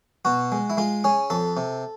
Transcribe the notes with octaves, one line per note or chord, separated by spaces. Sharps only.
B2 F#4
G#3
E4
G#3 F4
C#4 G#4
F2 A4
C3